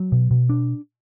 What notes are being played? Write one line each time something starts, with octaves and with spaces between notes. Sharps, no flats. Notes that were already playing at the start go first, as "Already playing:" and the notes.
Already playing: F#3
B2
B2
D4